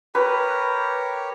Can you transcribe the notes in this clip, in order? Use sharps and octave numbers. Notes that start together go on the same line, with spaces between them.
G4 A#4 B4 C#5